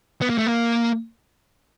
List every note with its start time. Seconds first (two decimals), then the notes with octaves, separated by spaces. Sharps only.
0.22 B3
0.30 A#3
0.38 A3
0.47 A#3